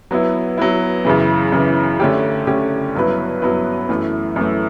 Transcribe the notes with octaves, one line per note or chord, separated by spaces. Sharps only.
F#3 B3 E4
F#3 B3 E4
F#2 C#3 E3
F#2 C#3 E3
D3 A3 C#4 G4
D3 A3 C#4 G4
G2 F#3 B3 E4 B4
G2 F#3 B3 E4 B4
F#2 E3 A3
F#2 E3 A3